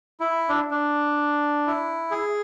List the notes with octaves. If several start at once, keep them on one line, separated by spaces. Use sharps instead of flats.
E4
D4
D4
E4
G#4